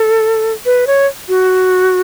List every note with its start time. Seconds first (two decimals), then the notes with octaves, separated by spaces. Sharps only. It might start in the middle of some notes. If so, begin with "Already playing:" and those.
Already playing: A4
0.66 B4
0.87 C#5
1.29 F#4